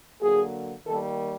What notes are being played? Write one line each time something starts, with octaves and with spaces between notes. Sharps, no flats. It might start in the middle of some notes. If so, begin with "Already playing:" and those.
D3 F#3 A#3 G#4
D#3 G3 A#3 A4